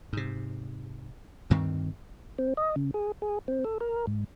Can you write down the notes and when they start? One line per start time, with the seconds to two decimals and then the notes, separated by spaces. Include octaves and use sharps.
0.13 G#2 C3
1.50 D2 G2 D#3 C4
2.39 C4
2.57 D#5
2.76 C#3
2.94 G#4
3.22 G#4
3.48 C4
3.64 A4
3.80 A#4
4.07 G#2